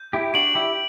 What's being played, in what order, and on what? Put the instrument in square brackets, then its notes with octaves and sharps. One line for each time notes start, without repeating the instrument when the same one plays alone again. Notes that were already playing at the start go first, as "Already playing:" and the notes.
Already playing: [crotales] G6
[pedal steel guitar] E4 G4
[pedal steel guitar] D4 F#4 [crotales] D7 F#7
[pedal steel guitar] E4 G4